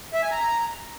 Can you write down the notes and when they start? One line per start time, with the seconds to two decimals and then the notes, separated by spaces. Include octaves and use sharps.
0.14 E5
0.22 G#5
0.31 A#5